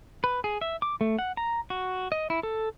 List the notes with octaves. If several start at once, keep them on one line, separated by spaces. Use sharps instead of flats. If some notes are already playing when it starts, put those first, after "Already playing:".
B4
G#4
E5
D6
A3
F#5
A#5
F#4
D#5
E4
A4